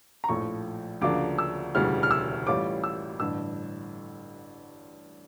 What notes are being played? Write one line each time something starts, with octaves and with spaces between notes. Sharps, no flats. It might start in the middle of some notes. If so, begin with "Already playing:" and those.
A#5
A#1 A2 F3 A3 C#6
D2 C#3 F3 A#3 D4 D6
E6
E1 D2 C#3 E3 G3 F6
F6
E6
A1 A2 G3 C#4 F4 D6
E6
A1 G2 D3 E6